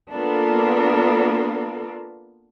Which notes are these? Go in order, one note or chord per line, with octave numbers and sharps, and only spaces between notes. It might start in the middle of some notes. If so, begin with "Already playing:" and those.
A#3 B3 D4 F4 A4 A#4